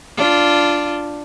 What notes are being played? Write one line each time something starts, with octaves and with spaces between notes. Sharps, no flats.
D4 F4